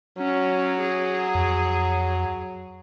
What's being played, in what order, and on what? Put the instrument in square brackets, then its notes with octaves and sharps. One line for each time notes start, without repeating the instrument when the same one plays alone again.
[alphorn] F#3 [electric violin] C#4
[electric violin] G#4
[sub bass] F2